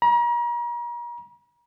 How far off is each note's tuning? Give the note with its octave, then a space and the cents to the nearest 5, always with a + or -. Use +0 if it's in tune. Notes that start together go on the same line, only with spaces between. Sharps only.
A#5 +40